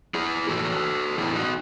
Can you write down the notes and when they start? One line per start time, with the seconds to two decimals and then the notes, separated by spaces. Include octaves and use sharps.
0.14 E4 G#4
0.49 A2 E3 F#4 A4
1.18 A2 E3 E4 G#4
1.35 D#4 F#4